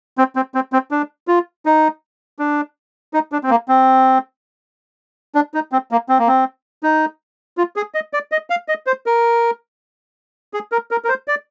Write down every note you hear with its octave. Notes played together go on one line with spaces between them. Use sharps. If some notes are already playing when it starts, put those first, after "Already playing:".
C4
C4
C4
C4
D4
F4
D#4
D4
D#4
D4
C4
A#3
C4
D4
D#4
C4
A#3
C4
A#3
C4
D#4
F4
G#4
D#5
D5
D#5
F5
D#5
C5
A#4
G#4
A#4
A#4
A#4
C5
D5